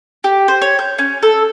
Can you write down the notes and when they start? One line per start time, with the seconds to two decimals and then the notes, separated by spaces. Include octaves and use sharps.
0.24 G4
0.48 C5
0.62 C#5
0.79 G6
0.98 C#4
1.23 A4